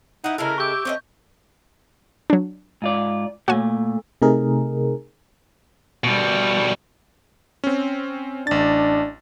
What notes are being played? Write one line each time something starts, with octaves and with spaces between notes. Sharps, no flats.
D#4 E4 F#5
C#3 G#3 E4 A4 A#4
G4 E5 G5 C#6 D6 G6
A3 C4 C#4 D#5
F#3 D4
G#2 F4 D5
A#2 A3 F#4 C#5 G#5
C3 A3 D#4 G#4 A#4
B2 G3
C4 C#4
A1 D4 A6